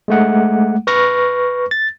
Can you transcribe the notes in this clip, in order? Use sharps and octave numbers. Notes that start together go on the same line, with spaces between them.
G#3 A3 F#5
B4 C#6 F6 A#6
A6